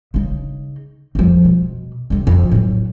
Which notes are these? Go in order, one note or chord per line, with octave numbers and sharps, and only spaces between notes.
C#3 D#4
F2 F3
B2
D2 C3
F2 F3
A2 F#3